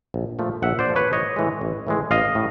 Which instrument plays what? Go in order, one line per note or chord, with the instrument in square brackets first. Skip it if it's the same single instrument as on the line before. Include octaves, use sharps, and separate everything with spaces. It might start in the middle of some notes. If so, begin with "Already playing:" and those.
[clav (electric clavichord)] A#1
A#2 F3 A3
A#1 E5 F#5
C5 D5
A#2 F3 A3
B4 C#5
A1 C#5 D#5
A2 E3 G#3
A1
A2 E3 G#3
A1 D#5 F5
A2